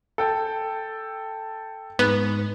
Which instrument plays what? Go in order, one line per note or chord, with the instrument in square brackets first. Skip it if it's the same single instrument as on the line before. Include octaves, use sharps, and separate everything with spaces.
[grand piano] A4 G5
[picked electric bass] G#2 [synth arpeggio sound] B3